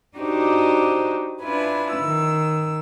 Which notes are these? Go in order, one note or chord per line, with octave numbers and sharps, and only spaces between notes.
D4 D#4 F#4 G4 C5
D4 E4 F4 B4 G#5
D#3 E6